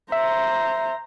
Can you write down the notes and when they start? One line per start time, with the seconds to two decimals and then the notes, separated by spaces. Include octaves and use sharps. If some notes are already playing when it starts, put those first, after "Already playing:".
0.12 C5 E5 A#5